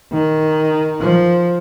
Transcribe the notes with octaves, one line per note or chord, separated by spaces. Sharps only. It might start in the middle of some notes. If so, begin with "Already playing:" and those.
D#3
F3